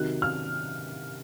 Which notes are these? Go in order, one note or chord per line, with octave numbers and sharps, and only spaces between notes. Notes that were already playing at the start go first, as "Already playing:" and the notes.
Already playing: C3 D#3 F#3 F#6
F6